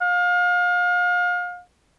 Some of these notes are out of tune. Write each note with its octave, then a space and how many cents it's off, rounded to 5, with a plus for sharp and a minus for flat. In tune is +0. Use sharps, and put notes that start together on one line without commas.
F5 +35